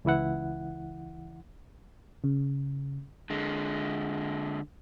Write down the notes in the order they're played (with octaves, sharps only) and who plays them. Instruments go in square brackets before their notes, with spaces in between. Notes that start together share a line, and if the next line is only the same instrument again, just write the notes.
[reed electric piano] C#2 E3 E4 F#5
[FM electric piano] C#3
[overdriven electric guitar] D3 G#3